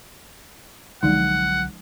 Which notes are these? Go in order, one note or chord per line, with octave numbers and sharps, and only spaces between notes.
C2 D3 F3 F#3 G#3 D#4 F#5